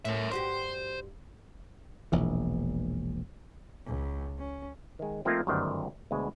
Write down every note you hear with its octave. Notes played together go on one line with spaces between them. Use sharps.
A2 A#4 E5
G2 F#4 G4 C5
E1 A#1 B2 E3
C#2
C#4
D#3 G#3
F3 A3 A#3 C4 D#4 F4
G1 F#2 D#3 A3 C5 D5
D2 B2 G#3